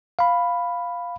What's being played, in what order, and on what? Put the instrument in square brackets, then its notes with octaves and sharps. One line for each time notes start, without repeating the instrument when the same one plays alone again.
[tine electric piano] F5 B5